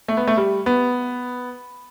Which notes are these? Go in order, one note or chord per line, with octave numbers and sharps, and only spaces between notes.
A3
B3
A3
G3
B3